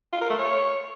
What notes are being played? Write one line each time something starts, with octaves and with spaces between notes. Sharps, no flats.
F4
A#4
A3
C#5